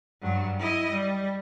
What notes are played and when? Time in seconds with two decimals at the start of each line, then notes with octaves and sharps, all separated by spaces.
0.22 G2 F#3
0.59 E4 D#5
0.91 G3